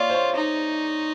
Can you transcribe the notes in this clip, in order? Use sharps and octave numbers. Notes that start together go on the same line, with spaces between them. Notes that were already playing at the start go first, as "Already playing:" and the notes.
Already playing: F4 C#5 D5
C5
C#5
D#4